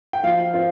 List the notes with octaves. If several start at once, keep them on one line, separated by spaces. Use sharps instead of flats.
G5
F3 F5
C4 F4